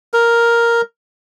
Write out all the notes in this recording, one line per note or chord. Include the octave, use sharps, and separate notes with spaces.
A#4